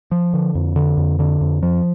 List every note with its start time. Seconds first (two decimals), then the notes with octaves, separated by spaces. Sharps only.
0.11 F3
0.34 D3
0.55 F2
0.76 D3
0.97 F2
1.19 D3
1.41 F2
1.63 F3